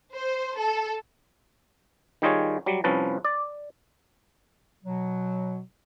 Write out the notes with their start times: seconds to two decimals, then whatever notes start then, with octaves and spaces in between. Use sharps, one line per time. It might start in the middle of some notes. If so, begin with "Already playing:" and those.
0.13 C5
0.57 A4
2.22 D#3 G3 D#4 F4 G#4 C#5
2.66 F#3 G3
2.84 C2 F3 C#4 B4 A5
3.25 D5
4.83 B2 F#3